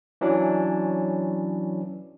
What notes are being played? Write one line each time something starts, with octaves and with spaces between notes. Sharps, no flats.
E3 F#3 C#4 D4